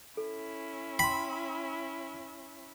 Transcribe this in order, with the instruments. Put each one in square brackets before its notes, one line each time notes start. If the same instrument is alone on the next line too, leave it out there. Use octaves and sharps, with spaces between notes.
[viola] C#4 E4 [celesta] A4
[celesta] G5 C6 [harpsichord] B5